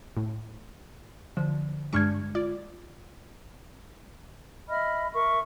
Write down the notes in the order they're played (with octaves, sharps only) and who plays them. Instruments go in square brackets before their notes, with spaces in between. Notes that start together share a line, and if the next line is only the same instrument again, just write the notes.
[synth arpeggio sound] A2
[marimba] D3 [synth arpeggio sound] F3
[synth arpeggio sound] G2 D4 C#6 [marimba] G#3 F6 G#6
[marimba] F4 [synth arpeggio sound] D5
[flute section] D#5 E5 B5 F6
A#4 E5 C#6